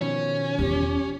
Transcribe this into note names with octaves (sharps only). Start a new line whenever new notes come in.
B2 D#3 F3 C#4
E2 F4 G4